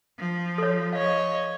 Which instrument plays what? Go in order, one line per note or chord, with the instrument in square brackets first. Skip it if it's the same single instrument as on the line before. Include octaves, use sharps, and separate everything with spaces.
[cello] F3
[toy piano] A4 C#5
[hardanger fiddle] C#5 D#5 [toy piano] F5